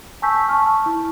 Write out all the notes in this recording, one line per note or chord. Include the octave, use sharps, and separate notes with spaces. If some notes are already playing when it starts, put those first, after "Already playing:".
G#5 A5 C#6 E6 G6 B6
A5 C#6 F6
E4